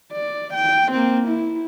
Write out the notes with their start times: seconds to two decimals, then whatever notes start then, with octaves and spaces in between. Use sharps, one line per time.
0.12 D5
0.54 G5
0.92 A#3 C4
1.28 E4